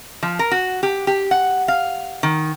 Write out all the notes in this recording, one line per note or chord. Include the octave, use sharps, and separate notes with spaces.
F3
A#4
F#4
G4
G4
F#5
F5
D#3